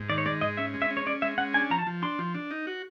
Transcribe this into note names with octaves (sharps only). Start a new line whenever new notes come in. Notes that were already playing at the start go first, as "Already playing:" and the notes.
Already playing: G#2
D#3 D5
C#5
G#3 D5
G#2 D#5
C#4 E5
G#3
E5
C#4
C#5
C#4 D5
G#3 E5
C#4 F#5
D4 G#5
F3 A#5
A5
F3
D4 C6
F3
D4
D#4
F#4